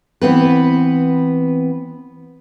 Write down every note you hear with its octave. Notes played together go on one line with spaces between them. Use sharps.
E3 B3 C4 B4